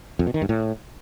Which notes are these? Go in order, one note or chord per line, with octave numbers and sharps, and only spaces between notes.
F2
B2
D#3
G2
A2